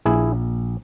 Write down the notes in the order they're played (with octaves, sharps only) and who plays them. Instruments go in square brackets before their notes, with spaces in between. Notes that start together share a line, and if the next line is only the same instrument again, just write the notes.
[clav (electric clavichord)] A#1 E4 G#4